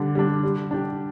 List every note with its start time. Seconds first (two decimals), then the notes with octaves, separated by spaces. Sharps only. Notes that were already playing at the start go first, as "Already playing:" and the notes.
Already playing: D3 G3 D4
0.15 G3 D4
0.43 G3
0.71 D4 G4